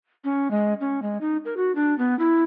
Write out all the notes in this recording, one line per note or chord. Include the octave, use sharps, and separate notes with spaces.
C#4
G#3
C#4
G#3
D#4
A#4
F#4
D4
B3
E4